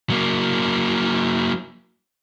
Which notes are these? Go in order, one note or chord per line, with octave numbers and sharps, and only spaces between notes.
F#3 A#3